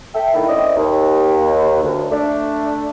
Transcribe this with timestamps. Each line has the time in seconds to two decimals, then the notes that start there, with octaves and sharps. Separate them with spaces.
0.15 A4 E5 G5
0.34 D3 D#3 A3 E4
0.48 C4 C#4 E4 D5 D#5
0.76 D#2
1.82 D2 D3
2.11 A3 D4